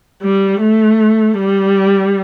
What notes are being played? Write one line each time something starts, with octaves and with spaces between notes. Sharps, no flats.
G3
A3
G3